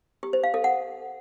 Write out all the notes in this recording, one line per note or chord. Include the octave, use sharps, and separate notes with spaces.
G4
C5
F5
A4
F#5